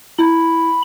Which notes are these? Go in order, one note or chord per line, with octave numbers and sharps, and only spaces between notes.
E4 B5